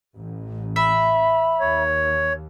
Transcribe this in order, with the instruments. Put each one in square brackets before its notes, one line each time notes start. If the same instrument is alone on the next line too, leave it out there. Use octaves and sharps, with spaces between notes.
[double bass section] A1
[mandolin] E5 [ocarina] B5
[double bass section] D#2 [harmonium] C#5